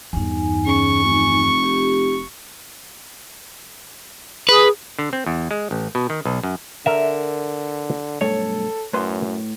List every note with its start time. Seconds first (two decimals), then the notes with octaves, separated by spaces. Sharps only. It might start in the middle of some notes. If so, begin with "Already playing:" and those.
0.13 E2 G2 D#4 G#5
0.66 C#3 C#6
1.04 F1
1.63 G4
4.49 G#4 B4
4.99 D3
5.13 C4
5.26 E2
5.51 G#3
5.71 A1
5.95 B2
6.10 D#3
6.25 B1
6.43 F#2
6.86 D3 A#4 E5
8.21 B1 G2 A3 A4 C#5
8.93 F#2 A2 B4 C6